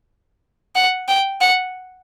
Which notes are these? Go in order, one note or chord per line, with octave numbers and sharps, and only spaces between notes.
F#5
G5
F#5